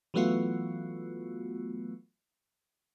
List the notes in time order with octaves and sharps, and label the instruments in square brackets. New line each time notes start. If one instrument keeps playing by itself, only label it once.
[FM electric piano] E3 F#3 A3 B3 F4 F#4